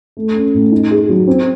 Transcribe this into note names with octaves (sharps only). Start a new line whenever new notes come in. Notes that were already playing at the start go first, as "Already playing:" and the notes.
A3
C#4
A2
D#4
G#4
F#3
C4